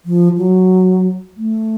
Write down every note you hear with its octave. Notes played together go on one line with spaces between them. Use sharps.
F3
F#3
A3